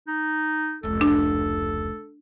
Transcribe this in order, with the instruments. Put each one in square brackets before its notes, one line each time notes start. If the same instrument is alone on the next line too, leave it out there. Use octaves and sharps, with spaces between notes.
[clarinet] D#4
[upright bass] F1 C#2 [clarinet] A4
[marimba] D4